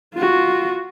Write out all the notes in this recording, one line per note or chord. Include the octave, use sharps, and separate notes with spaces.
F4 F#4